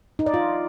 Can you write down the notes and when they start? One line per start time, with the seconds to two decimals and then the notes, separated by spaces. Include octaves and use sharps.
0.19 D#4
0.26 D5
0.34 F4